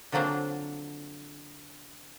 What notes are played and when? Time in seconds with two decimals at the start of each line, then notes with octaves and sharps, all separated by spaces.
0.12 D3 F3 F#3 A#3 C4 D4